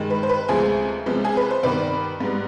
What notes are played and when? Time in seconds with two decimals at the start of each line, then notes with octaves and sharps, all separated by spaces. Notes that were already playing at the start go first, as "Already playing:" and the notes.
Already playing: G2 D#3 G#3
0.10 B4
0.23 C5
0.29 B4
0.48 D2 C3 F3 G#3 B3 G#4 C5
1.06 C2 C3 F3 G#3 B3
1.24 G#4
1.37 B4
1.51 C5
1.63 G2 D#3 B3 B4 D5
2.20 G#2 G3 B3